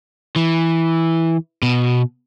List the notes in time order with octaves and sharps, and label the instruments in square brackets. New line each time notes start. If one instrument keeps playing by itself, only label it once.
[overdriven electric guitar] E3
B2